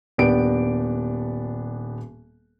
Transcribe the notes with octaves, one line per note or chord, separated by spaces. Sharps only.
D#1 B3 D4 G4 D7